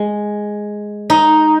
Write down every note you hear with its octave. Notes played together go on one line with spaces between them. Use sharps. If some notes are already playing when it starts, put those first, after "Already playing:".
Already playing: G#3
D#4